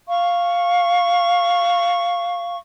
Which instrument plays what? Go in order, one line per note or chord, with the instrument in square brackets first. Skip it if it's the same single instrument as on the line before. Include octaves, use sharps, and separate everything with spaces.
[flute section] F5 C#6